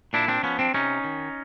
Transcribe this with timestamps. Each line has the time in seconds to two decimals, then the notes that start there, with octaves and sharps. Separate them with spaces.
0.13 A#2 D4 E4
0.28 C4 D4
0.43 F3 B3 C#4
0.59 C4 D4
0.74 C3 C#4 D#4
1.04 D#3